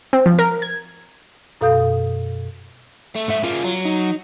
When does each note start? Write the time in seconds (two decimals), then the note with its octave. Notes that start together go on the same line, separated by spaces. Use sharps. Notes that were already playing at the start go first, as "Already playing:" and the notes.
0.13 C4
0.26 F3
0.39 A#4
0.62 G#6
1.61 F#2 B2 A4 F5 D#6 G6
3.16 A3
3.28 G#2 E5
3.44 C#3 A#3 F4
3.64 F#3
3.85 D#4